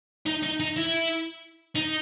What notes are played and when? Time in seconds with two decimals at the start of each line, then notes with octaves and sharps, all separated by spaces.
0.26 D#4
0.43 D#4
0.60 D#4
0.76 E4
1.76 D#4